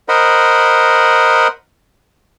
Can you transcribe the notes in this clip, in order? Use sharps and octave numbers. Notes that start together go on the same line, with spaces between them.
A#4 C5 D#5 F#5 B5